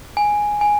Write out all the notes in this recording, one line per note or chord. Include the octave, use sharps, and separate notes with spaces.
G#5
G#5